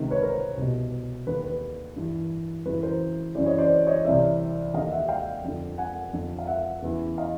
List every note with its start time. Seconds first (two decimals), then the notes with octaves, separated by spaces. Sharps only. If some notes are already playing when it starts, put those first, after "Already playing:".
Already playing: C#2 C3 D#3
0.10 B4 C#5
0.23 A#4 C5
0.57 C2 B2
1.27 D#2 D3 B4
1.44 B4
1.96 G2 E3
2.66 F#2 C#3 E3 B4
2.83 A#4 C5
3.35 F#2 C#3 E3 C5 D5
3.46 C#5 D#5
3.58 C5 D5
3.87 C#5 D#5
4.04 C2 C3 E3 D5 E5
4.74 D#2 D3 D#5 F5
4.91 E5 F#5
5.08 F5 G5
5.44 F2 D3
5.78 F#5 G#5
6.13 F2 D3
6.39 F5
6.47 E5 F#5
6.82 E2 C#3 E3
7.18 D#5 F5